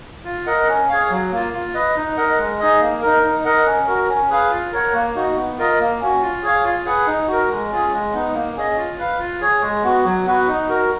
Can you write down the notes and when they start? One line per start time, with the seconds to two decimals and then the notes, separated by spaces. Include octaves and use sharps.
0.25 F4
0.46 A#4 D#5 F#5
0.68 C#4
0.89 G#4 C#5 F5
1.10 F#3
1.31 A#3 F4
1.53 F4
1.74 B4 D#5
1.96 D#4
2.17 A#4 D#5 F#5
2.39 G#3
2.59 D#4 G#4 D#5
2.81 A#3
3.02 D#4 A#4
3.23 D#4
3.45 A#4 D#5 F#5
3.66 C#4
3.87 F#4 A#4
4.09 C#4
4.30 G#4 B4 F5
4.51 F4
4.72 A#4 C#5 F#5
4.94 A#3
5.15 D#4 F#4
5.36 B3
5.58 F4 A#4 D#5
5.79 A#3
6.00 C#4 F#4
6.22 F4
6.43 G#4 C#5 F5
6.64 F4
6.85 G#4 B4 F#5
7.07 D#4
7.28 F#4 A#4
7.50 G#3
7.70 C#4 F4 G#4
7.92 G#3
8.13 B3 D#4
8.34 A#3
8.56 C#4 G#4 D#5
8.78 F4
8.99 B4 F5
9.20 F4
9.41 G#4 C#5
9.62 G#3
9.84 B3 F#4
10.05 F#3
10.26 B3 F#4 B4
10.48 D#4
10.69 F#4 A#4